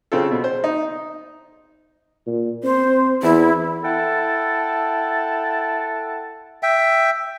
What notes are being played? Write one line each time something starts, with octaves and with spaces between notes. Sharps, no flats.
C#3 C4 F4 A4
B2
C5
D#4
A#2
C4 C5
E2 E4
E4 A4 F#5 G5 A5
E5 G5